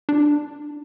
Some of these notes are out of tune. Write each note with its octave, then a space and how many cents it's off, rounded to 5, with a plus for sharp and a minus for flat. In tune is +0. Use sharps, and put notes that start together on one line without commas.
D4 +20